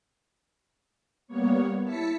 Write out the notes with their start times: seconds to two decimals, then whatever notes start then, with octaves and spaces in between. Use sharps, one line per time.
1.28 G3 A#3 B3 C#5
1.82 E4 A5 B6 C#7